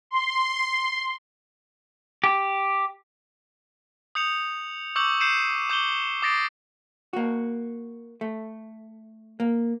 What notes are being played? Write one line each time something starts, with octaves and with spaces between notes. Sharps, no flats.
C6
G4
D#6 G6 C#7 F7
C#6 D6 E6 G6 C#7 F#7
G6 C7 C#7 D#7 E7
D6 G6 F#7 G7
D6 D#6 A6 A#6 C7 D7
A#3 F#4
A3
A#3